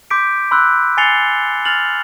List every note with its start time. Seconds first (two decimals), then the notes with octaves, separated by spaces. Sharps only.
0.10 C6 D6 G6 B6 D7
0.51 B5 C6 E6 F#6
0.97 G#5 A6 C7 C#7 F7 G7
1.65 F6 A6 F7 F#7